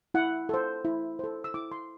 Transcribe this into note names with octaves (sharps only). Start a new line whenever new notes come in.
E4 F#5
A4 C5
E4
A4 C5
E6
E4 D6
C6